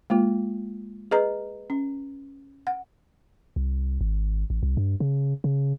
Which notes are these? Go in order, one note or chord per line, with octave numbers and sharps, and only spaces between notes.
G#3 A#3 F4
G#4 B4 D#5 A#5
C#4
F#5
C2
G#1
A1
C2
G2
C#3
C#3